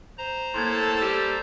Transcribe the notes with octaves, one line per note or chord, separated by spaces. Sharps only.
C5 A#5
A2 A#3 A4 C6 G6 G#6
G3